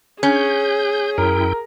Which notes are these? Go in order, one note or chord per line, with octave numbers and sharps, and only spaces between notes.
C#4 G#4 G6
F#2 E4 A#4 G5